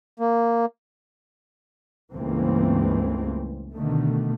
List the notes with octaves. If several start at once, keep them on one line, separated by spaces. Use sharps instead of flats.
A#3
C#2 G2 E3 A3 A#3 C4
B2 D3 D#3 A3